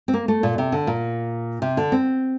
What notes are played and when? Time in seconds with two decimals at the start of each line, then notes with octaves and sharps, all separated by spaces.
0.08 C4
0.13 A#3
0.28 A3
0.43 A#2
0.58 C3
0.72 D3
0.87 A#2
1.62 C3
1.77 D3
1.92 C4